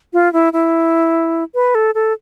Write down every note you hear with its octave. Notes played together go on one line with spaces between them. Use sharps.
F4
E4
E4
B4
A4
A4